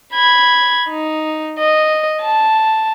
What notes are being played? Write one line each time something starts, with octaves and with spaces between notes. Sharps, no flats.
B5 G#6
D#4
D#5
A5